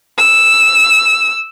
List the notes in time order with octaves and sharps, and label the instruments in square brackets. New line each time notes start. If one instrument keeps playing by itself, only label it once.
[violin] E6